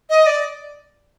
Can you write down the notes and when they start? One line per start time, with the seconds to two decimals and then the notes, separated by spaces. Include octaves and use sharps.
0.10 D#5
0.27 D5